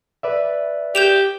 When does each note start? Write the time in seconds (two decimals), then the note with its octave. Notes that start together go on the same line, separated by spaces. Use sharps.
0.23 B4 D5 E5
0.95 G4 G6 E7 F7